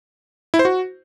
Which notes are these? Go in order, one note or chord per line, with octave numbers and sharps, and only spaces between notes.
E4
C5
F#4